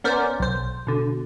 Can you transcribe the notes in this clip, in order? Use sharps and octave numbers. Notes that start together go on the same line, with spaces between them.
B3 C#4 A#4 C5 D5
B1 C5
B2 D3